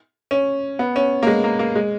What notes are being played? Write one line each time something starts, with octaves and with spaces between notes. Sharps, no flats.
C#4
B3
C#4
A#3
G#3
A#3
A#3
G#3